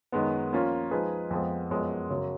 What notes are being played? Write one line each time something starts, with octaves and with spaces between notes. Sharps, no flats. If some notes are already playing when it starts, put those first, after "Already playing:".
F#2 D#3 G#3 B3
F3 A#3 C#4 F4
F3 G#3 D#4 G#4 B4
F2 F3 G#3 B3
F#2 F3 G#3 B3
F#2 C#3 F#3